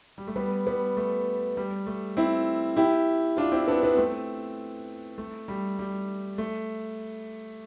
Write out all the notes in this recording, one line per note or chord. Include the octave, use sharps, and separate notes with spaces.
G3
A3
G3 B3
G3 B3
A3
G3
A3
C4 E4
E4 G4
D4 F4
C4 E4
B3 D4
B3 D4
A3 C4
A3
G3
G3
A3